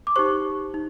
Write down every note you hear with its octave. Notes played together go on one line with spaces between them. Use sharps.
D6
D#4 G4 C5 C#6
D#4